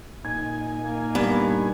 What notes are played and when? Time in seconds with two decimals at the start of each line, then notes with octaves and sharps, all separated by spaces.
0.25 A#2 D#4 G#5 G#6
0.81 A#3
1.15 G2 B3